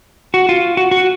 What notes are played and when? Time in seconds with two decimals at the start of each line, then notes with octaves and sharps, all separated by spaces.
0.34 F#4
0.49 F4
0.77 F#4
0.91 F#4